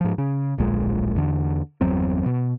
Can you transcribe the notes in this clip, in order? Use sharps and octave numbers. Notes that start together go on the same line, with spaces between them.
G#2 F3
C#3
D1 A#1 A#2 G#3
E2 D3
G1 E2 F#3 C4
B2